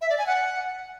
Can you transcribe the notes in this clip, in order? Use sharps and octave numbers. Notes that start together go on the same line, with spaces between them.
E5
D5
G#5
F#5